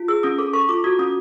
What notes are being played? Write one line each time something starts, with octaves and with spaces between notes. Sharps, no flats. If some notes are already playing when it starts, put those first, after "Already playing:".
Already playing: F4
G#4 E6
C#4 D#6
A4 D6
A4 C#6
F4 D6
F#4 D#6
C#4 D#6